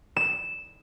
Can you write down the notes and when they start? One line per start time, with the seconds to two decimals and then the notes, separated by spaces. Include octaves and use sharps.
0.16 E7